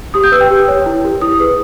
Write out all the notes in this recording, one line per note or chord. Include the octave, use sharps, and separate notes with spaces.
G4 D#6
G6
B4 E6
G5
G4
C#5
E4
G4 A#4
E4 D#6
G#4 B4